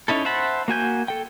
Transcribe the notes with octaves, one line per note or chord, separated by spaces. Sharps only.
C#4 D#4 E4 A4
C5 E5 F#5 A5 B5
A#3 F#4 G#5 G6
A4 G5